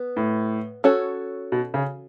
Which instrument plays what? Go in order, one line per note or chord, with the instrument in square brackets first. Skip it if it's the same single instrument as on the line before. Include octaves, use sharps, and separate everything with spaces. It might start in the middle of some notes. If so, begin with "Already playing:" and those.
Already playing: [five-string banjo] B3
[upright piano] A2
[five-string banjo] C#4 F#4 A4 C#5
[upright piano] B2
C#3